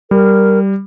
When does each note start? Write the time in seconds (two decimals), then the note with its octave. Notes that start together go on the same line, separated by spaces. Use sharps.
0.11 G3 A#4